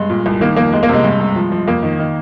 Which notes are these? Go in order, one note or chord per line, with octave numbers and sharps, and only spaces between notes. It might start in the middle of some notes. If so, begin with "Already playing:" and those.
Already playing: G2 G#3
A#2
C2
D#3 A#3
F2 A#3
C2 G#3
A#3
C3 G#3
G2
G2
F3
F3
F2 A#3
D#3
D#3